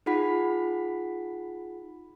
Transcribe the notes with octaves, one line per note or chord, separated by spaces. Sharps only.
D#4 F4 G#4 F#5 B5 B6